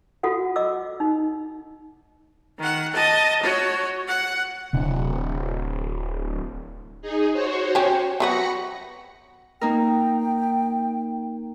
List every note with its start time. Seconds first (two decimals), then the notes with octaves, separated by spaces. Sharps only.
0.23 F4 F#4 A4 F#5
0.56 D#5 D6 E6
1.00 D#4
2.58 D#3 F#5
2.93 D#5 A5
3.43 F#4 C#5
4.08 F#5
4.73 D1 C3 C4
7.02 D#4 G#4
7.32 F#4 C5 C#5
7.75 C#4 G4
8.20 F#3 B3 F#4 B5 A#6 C#7
9.61 A#3 D#4 A#4 G5